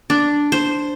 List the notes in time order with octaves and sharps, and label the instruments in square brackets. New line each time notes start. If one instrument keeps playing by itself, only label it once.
[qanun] D4
C5